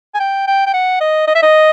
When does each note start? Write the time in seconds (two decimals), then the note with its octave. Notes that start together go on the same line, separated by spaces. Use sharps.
0.15 G#5
0.20 G5
0.47 G5
0.66 G5
0.74 F#5
1.01 D#5
1.27 D#5
1.35 E5
1.42 D#5